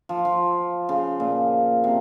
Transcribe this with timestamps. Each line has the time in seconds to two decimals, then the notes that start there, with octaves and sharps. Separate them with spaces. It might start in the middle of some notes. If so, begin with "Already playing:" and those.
0.09 F3
0.25 F3
0.89 C#3
1.20 A#2
1.84 C3